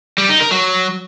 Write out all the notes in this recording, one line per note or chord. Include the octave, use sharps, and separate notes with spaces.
G3
D#4
A#4
F#3